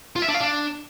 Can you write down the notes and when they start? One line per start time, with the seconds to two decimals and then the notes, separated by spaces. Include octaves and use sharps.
0.16 F4
0.22 E5
0.28 D4
0.35 F5
0.41 D4